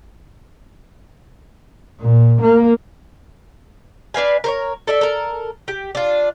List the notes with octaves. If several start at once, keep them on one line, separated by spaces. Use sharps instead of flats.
A#2
A#3
D4 B4 F5 G#5
A#4 C5 C#5
A4 D5 E5
A4 A#4
G4
D4 F4